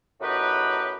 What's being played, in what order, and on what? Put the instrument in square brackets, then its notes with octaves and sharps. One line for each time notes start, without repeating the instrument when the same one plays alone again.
[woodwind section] F#2 A2 D#4 F#4 G4 B4